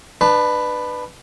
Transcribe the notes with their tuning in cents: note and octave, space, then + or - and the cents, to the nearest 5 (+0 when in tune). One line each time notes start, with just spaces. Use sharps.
D4 +40 B4 +5 A5 +0